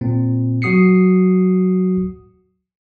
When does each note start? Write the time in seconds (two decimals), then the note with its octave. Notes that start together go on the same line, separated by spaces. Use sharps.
0.01 A#2 C4
0.62 F#3 F#4 D#6 C7 C#7